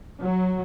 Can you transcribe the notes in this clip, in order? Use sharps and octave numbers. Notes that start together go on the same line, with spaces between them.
F#3